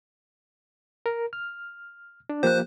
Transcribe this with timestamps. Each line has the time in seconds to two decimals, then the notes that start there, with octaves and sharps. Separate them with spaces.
1.06 A#4
1.33 F6
2.29 D4
2.43 F3 A#3 G4 C5 F#6